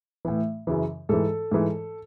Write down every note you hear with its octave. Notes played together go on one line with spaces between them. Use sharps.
A2 E3
F#2 C#3 E3
G#2 E3 A4
G#2 E3